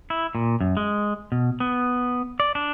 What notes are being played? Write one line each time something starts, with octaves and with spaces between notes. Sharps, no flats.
E4
A#2
F#2
G#3
B2
B3
D5
D4